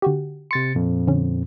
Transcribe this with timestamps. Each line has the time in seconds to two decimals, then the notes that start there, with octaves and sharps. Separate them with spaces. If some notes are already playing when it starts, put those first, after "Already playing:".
0.02 D3 F#4 G4
0.51 C3 C6 A6 C#7
0.75 F2 A#2
1.08 D3 C#4